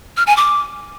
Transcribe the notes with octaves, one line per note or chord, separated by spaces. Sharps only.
F6
G#5
D6